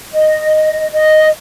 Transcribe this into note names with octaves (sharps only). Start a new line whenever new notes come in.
D#5
D#5